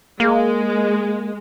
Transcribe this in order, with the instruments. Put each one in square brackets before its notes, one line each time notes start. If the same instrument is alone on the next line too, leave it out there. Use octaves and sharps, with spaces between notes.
[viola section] G#3 [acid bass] A#3